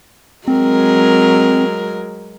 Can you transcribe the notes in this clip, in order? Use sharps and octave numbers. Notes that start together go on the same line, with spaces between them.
F#3 G#3 C4 A#4